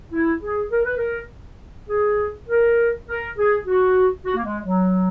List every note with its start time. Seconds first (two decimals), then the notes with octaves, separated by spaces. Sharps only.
0.12 E4
0.41 G#4
0.70 A#4
0.84 B4
0.96 A#4
1.89 G#4
2.48 A#4
3.07 A#4
3.37 G#4
3.66 F#4
4.25 F#4
4.35 A#3
4.44 G#3
4.64 F#3